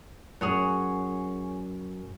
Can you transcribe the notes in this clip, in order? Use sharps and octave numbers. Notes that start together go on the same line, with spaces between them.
F#2 G#4 C#5 F#5